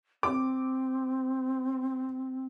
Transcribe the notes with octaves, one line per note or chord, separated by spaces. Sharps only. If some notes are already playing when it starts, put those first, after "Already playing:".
C4 D6